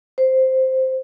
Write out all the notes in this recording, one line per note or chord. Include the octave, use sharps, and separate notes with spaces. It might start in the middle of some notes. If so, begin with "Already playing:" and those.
C5